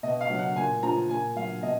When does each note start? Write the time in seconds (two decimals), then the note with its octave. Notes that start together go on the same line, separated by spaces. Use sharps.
0.03 B2 D#5
0.21 F5
0.30 F#3
0.39 F#5
0.56 A#2 G#5
0.83 F3 A#5
1.09 A#2 G#5
1.35 F#3 F5
1.63 B2 D#5